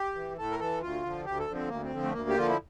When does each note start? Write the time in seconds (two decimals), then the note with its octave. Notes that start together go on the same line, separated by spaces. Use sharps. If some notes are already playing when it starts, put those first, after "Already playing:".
Already playing: G4
0.15 E3
0.38 A2 A4
0.51 A#4
0.59 E3 A4
0.81 D2 F4
1.03 D3 F3
1.25 D2 G4
1.39 A4
1.47 D3 F3
1.55 C4
1.68 D2 A#3
1.82 C4
1.91 D3 F3
2.03 A3
2.12 D2 A#3
2.29 G4
2.35 D3 F3 F4
2.48 E4